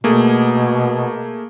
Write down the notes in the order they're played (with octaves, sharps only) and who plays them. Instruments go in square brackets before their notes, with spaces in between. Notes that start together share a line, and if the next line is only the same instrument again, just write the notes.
[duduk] B2 [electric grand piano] A3 A#3 G#4